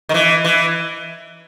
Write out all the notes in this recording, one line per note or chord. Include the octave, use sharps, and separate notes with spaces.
D#3
E3
E3